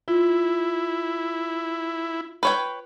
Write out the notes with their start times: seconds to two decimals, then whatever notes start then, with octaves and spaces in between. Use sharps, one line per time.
0.08 E4 F4
2.43 B4 C#5 G5